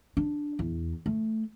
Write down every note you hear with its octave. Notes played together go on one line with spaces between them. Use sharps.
D4
E2
A3